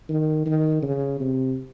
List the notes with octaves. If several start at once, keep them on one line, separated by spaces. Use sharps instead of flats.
D#3
D#3
C#3
C3